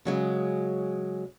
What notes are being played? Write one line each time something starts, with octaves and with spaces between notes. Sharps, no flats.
C#3 F#3 G#3